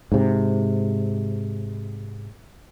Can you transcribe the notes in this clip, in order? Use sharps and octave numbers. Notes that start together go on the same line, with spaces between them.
G#2 C3